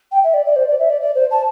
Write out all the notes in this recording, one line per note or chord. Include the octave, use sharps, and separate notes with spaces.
G5
E5
D5
D5
C5
D5
E5
D5
D5
C5
A5